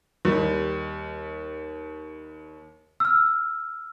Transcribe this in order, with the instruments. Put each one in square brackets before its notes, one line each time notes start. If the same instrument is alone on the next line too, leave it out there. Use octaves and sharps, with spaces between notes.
[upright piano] D#2 G3
[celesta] E6 F6